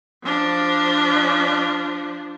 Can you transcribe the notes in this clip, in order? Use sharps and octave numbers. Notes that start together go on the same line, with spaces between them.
F3 D4